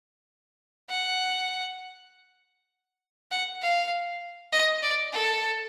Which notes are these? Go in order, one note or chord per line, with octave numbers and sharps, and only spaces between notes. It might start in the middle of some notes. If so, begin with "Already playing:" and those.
F#5
F#5
F5
D#5
D5
A4